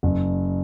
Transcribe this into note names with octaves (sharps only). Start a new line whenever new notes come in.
F#1